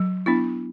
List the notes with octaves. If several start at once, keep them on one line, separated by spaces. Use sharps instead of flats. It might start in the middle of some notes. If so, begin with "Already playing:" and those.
Already playing: F#3
B3 D4 E4